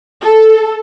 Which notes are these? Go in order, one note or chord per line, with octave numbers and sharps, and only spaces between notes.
A4